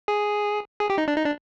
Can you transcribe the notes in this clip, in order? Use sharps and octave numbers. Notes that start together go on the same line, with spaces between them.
G#4
G#4
G4
D#4
D4
D#4
D4